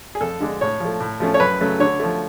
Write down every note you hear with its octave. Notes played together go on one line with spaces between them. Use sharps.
G#4
F2 A4
D3 G#3 D4
A2 C#5
F3 A3
A2
F3 A3 C#4
C#5
F#2 B4
C#3 F#3 A3
D3 C#5
F3 A3